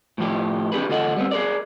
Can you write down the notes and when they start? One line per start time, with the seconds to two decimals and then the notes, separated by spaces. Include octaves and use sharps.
0.18 A2 F3 G4
0.72 C4 D4 G4 G#4 B4
0.89 D2 F4 A4 D#5 F#5
1.16 G3 B3 C4
1.31 G#4 A#4 D5